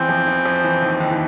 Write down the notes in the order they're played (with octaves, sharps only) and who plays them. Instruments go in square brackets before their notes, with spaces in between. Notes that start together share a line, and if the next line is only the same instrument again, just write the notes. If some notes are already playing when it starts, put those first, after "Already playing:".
Already playing: [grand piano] E2 E3 [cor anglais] C4
[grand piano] F2 F3
E2 E3
F2 F3
E2 E3
D#2 D#3
D#2 D#3
E3